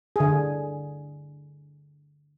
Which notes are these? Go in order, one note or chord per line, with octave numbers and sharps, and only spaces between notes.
D3 G#4